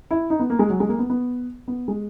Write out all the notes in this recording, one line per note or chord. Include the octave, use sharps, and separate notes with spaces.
E4
D#4
B3
A#3
G#3
F#3
G#3
A#3
B3
B3
B3
G#3